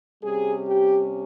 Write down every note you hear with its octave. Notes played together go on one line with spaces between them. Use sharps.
C3 G3 C#4 G#4
G4